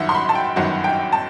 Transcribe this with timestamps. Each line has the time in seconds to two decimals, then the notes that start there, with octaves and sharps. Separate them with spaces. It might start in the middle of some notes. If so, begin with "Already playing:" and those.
Already playing: G1 F#2 D#3 F#3 E5 F#5
0.09 C6
0.15 B5
0.29 A5
0.35 G5
0.56 G1 F#2 D#3 F#3 F#5
0.84 G5
1.12 A5